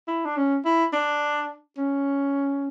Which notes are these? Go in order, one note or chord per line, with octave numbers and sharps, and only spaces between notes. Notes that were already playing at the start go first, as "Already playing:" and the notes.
E4
D4
C#4
E4
D4
C#4